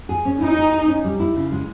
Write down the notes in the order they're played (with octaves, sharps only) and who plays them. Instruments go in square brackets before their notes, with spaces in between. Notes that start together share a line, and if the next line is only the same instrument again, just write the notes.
[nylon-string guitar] G#4
C#4
[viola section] D#4 [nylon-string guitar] E4
[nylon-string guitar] G#4
G#4
C#4
G3
E4
C#3
G#3